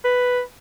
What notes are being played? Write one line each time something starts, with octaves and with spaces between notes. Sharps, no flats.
B4